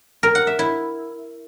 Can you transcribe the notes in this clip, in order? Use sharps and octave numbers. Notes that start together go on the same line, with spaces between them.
A#4
F#5
E5
E4